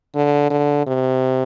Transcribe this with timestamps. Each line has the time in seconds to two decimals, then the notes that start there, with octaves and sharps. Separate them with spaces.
0.15 D3
0.50 D3
0.87 C3